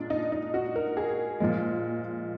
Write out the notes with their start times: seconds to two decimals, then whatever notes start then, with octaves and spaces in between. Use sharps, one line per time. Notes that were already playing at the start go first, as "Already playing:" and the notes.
Already playing: A#2 G#3 D4
0.10 D#4
0.32 D#4
0.54 F#4
0.76 A#4
0.97 G#4
1.40 A#2 F3 G#3